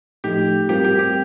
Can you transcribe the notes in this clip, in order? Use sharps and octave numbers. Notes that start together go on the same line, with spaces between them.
A2 F3 A3 D#4 G4
G3 C4 F4 G4 A#4
G4
G4